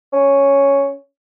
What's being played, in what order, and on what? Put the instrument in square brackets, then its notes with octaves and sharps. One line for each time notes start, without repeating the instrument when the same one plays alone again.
[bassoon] C#4